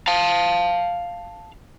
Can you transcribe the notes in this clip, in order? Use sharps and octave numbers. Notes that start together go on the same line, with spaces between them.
F5 A5